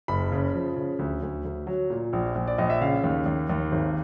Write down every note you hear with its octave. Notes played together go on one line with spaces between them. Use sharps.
F#1 B5
C#3
F3
C#3
D2
D2
D2
F#3
A#2
A#1
A#1
D5
A#1 D#5
E5
C#3 F5
D#2
D#2
D#2
G#1